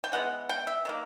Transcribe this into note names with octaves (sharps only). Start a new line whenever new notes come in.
G5
E3 G#3 B3 F#5
G5
E5
D#3 F#3 A#3